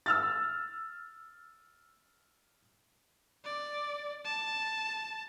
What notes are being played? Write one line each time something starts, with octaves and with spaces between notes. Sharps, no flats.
E6 F6 A6
D5
A5